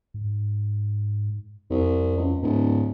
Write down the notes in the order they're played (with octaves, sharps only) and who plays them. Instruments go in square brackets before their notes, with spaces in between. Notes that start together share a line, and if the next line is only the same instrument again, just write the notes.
[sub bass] G#2
[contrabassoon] C2 [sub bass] F2
[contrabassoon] C#2
[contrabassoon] D1 [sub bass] G#2